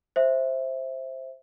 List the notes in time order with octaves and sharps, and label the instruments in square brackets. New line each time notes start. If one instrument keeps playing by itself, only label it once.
[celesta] C5 E5